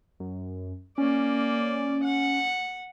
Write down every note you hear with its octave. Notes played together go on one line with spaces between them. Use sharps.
F#2
A#3 C#4 D5
F#5